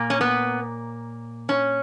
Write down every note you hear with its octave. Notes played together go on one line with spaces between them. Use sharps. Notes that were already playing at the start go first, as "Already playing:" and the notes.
Already playing: A#2 A#3
C#4
B3
C#4